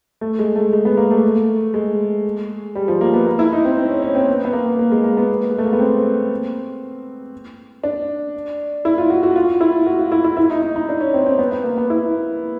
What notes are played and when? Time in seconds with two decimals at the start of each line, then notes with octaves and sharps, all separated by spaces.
0.21 A3
0.39 G#3
0.56 A3
0.73 G#3
0.85 B3
0.97 A#3
1.11 A3
1.74 G#3
2.75 G3
2.88 F3
3.01 A#3
3.14 B3
3.26 A#3
3.39 E4
3.52 D#4
3.65 C4
3.78 C4
3.89 C#4
4.02 C#4
4.15 C4
4.28 B3
4.45 B3
4.53 A#3
4.79 A#3
4.92 G#3
5.04 A#3
5.17 B3
5.51 G#3
5.58 A3
5.65 A#3
5.73 B3
5.80 C4
7.83 D4
8.85 E4
8.98 F4
9.10 F#4
9.23 F#4
9.36 F4
9.61 E4
9.87 F#4
9.99 F4
10.12 E4
10.24 E4
10.37 E4
10.50 D#4
10.62 D#4
10.76 D#4
10.89 D4
11.01 C#4
11.14 C4
11.26 C4
11.39 B3
11.52 B3
11.64 A#3
11.78 B3
11.90 E4